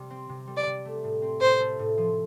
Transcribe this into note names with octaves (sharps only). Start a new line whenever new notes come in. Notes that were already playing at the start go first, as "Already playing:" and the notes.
Already playing: C3 G3
C4
C3
G3
D5
C3
A3
A2
C4
A2 C5
A3
A2
F3